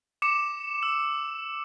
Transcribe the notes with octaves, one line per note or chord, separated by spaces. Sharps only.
D6 C#7 E7
E6